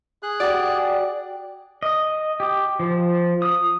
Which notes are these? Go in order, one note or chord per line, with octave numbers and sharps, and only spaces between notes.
G#4 F#6
F#4 G4 D5
D#5
G4
F3
D#6